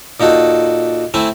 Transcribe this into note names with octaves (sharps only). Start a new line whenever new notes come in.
A#2 D#4 F#4 A4
A3 C4 E4 G#5